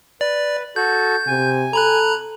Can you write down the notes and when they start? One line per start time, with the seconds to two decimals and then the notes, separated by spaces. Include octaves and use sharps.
0.21 B4 D5
0.76 F#4 A4 G6
1.27 C3 G#5
1.73 A4 A#5 B5 F#6